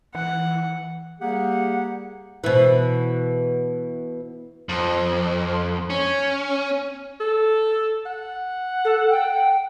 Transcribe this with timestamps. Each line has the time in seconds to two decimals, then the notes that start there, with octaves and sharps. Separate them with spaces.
0.15 E3 F#5
1.21 G3 A#3 G4 G#4 F#5
2.44 B2 E3
4.69 F2
5.90 C#4
7.20 A4
8.06 F#5
8.84 A4
9.10 G5